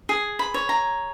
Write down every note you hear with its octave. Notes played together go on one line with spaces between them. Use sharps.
G#4
B5
C#5
A#5